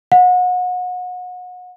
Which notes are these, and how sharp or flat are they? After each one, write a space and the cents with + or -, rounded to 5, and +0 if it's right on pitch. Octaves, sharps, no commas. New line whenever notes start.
F#5 -30